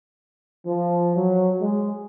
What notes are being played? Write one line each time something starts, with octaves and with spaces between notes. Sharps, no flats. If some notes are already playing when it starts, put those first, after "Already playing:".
F3
F#3
G#3